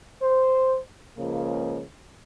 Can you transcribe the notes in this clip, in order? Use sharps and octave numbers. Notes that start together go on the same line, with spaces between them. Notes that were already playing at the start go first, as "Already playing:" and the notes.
C5
C#2 C#3 F3 A#3